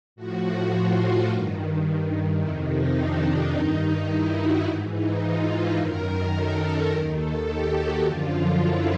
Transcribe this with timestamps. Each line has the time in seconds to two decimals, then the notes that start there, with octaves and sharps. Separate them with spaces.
0.16 A2 F3 F#4
0.71 F4
1.28 G2 D#3
2.40 F2 C3 D#3 E4
2.69 D#4
2.97 D4
3.24 D4
3.52 G2 D#3 D#4
4.08 E4
4.37 F#4
4.64 G#2 E3
4.93 D#4
5.21 F4
5.49 E4
5.76 F#2 D#3 A#4
6.33 A4
6.88 D#2 D#3 A#4
7.16 A4
7.45 G4
7.73 F#4
8.00 F#2 D3 F3 F4
8.56 E4